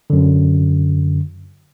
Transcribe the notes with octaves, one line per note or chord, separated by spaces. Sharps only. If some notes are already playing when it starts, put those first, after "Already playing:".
F#2 D3